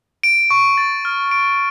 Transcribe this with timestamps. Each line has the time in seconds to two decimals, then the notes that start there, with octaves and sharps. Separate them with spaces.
0.23 D7
0.51 C#6
0.78 A6
1.05 F6
1.31 D7